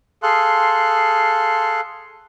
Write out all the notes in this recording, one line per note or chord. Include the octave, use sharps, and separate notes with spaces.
G#4 A4 F5 C6 F#6